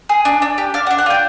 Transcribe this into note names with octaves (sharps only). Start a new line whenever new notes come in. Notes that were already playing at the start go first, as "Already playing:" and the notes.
G#4
D4
D4
G4
D4 F5
F#5
D4
F#5
F4 G5